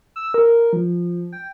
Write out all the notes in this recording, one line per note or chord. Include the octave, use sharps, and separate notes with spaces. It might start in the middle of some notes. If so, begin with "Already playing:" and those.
E6
A#4
F3
G5